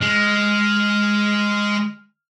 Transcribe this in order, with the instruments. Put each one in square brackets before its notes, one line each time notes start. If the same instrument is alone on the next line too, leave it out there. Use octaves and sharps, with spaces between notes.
[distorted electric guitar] G#3 [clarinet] F6